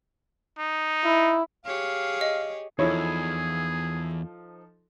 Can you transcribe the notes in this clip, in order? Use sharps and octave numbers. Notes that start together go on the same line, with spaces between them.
D#4
E4
G4 G#4 C#5 F5
D#5
E2 F3 D#4 E4 G#4 A4 C#5